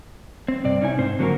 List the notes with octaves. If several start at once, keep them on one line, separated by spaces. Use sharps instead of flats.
C4
G2 C3 D5
C#4 D#4 E4 G#5
G#2 C4 C5
D3 F#3 A#3 C#4 F#4 A#4